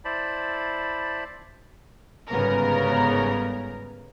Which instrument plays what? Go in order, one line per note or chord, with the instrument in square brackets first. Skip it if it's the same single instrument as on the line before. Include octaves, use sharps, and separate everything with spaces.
[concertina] E4 C5 D5 A5 B5
[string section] G1 G#2 C#3 B3 A#4